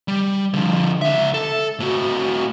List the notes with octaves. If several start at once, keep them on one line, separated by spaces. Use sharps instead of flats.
G3
D3 F3
C#2 E5
A4
A2 F#4